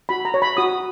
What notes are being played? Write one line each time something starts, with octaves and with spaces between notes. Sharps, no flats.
F#4 B5
A#5
C#5
B5
F#4 D#6